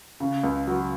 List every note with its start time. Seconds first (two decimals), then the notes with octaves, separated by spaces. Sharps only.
0.20 C#3
0.44 C#2
0.67 F#3